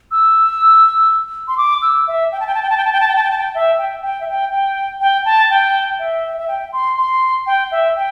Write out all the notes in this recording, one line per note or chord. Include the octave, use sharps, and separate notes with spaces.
E6
C6
D6
E6
E5
G5
A5
G5
A5
G5
A5
G5
A5
G5
A5
G5
A5
G5
A5
G5
E5
G5
G5
E5
G5
G5
G5
A5
G5
E5
E5
G5
C6
C6
G5
E5
G5